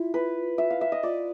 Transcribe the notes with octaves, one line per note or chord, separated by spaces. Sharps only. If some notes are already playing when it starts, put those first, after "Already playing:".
Already playing: E4 F4
B4
E5
F5
E5
D#5
F4 D5